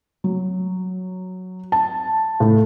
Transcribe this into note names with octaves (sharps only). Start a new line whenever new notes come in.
F#3
A5
A2